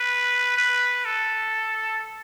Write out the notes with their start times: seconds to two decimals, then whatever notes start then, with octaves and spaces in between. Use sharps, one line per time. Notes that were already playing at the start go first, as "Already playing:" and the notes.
Already playing: B4
0.57 B4
1.05 A4